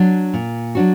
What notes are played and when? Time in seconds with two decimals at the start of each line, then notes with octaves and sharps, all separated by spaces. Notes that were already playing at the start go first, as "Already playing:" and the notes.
Already playing: F#3 D4 F#4
0.34 A#2
0.75 F#3 D4 F#4